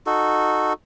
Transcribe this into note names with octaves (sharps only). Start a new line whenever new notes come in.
D#4 F#4 A4